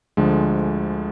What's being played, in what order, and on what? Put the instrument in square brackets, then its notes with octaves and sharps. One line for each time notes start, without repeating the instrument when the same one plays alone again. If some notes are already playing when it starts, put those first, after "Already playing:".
[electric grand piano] D2 D3 F3 G#3